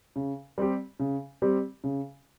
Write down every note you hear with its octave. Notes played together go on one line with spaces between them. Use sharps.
C#3
G3 C4 G4
C#3
G3 C4 G4
C#3